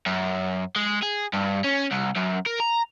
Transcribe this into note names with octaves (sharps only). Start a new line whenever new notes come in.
F#2
G#3
G#4
G2
C#4
C2
F#2
A#4
A#5